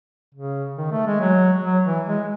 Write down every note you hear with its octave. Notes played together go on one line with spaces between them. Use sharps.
C#3
D#3
A3
G#3
F#3
F#3
E3
G#3